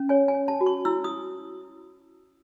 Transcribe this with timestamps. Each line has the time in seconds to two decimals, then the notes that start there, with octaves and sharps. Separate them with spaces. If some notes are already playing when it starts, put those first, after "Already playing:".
Already playing: C#4
0.09 C#5 G#5
0.28 G#5
0.35 C#5
0.48 A5
0.61 F#4
0.66 C#6
0.85 E4 E6
1.04 D#6